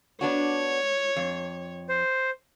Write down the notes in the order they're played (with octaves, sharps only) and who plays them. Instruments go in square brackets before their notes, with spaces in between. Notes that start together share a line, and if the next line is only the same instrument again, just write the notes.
[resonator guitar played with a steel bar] B3 D4 F#4 [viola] C#5
[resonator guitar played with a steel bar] F2
[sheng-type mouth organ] C5